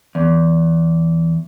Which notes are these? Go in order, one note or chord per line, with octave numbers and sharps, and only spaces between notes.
E2